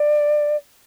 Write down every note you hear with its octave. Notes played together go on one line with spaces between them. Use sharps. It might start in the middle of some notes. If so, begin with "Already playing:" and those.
Already playing: D5